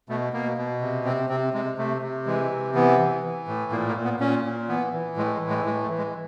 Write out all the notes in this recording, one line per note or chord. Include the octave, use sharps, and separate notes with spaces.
B2 A3
B2 A#3
B2
C3
C3 C4
C3 C4
C3 G#3
C3 A3
C3
E3 G#3
C3
E3 B3
E3
E3
A2
A#2 A#3
A#3
A#2
B3
A#2 C#4
A#2
E3 B3
E3
A2 G#3
G#3
E3
G#3
A2 G#3
A3
E3
G#3